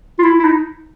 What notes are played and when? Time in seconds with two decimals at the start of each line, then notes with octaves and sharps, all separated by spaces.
0.19 F4
0.23 E4
0.39 E4
0.44 D#4